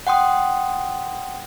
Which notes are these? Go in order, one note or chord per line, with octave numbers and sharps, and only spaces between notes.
F#5 G5 C6 D#6